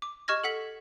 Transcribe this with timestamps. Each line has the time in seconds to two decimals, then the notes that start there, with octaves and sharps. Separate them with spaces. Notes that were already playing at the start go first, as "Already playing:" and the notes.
0.02 D6
0.28 G4 D#5 C#6 F6 G#6 A#6
0.44 A4 F#5 B6 F#7